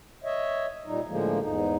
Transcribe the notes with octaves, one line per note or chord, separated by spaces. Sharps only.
C#5 D#5 E5
A#2 G3 D#4
A2 D3 F3 G#3 A#3
E2 G#2 D#4